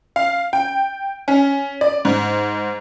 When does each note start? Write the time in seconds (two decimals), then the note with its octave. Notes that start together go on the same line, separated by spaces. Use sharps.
0.16 F5
0.53 G5
1.28 C#4
1.81 D5
2.05 G#2